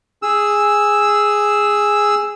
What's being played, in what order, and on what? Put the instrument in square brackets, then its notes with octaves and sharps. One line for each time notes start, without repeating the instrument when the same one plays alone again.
[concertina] G#4 E6